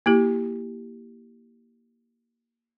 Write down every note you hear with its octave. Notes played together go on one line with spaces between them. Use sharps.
A#3 E4 G4